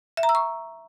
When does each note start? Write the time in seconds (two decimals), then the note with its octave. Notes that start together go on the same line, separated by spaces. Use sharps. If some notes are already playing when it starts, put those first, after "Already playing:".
0.17 E5
0.23 A#5
0.29 E6
0.35 C#6